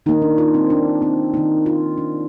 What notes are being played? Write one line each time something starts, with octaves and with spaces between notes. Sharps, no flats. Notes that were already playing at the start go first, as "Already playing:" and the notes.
D#3 A#3 D#4
D4
F4
C4
D4
C4
D#3 A#3 D#4
F4
D4